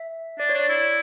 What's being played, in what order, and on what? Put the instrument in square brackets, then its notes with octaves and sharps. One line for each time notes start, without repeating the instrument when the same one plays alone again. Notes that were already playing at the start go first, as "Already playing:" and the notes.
Already playing: [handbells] E5
[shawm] D4 [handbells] D5
[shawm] D4 [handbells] C#5
[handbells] D5
[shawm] E4